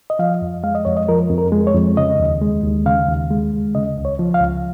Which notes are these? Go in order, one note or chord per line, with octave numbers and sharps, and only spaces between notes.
D#5
F3 F5
F2
G#3 F5
D#5
F2 C#5
D#5
F3 A#4
F2
A#4
G#3
C#5
F2
C#3 D#5
D#2
G#3
D#2
C#3 F5
D#2
G#3
D#2
C#3 D#5
C#2
C#5
F3
F5
C#2